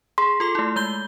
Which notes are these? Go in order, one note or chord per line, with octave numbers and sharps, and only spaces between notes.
G#4 C6
F4 A4 D6
A3 E4
G#3 G6 G7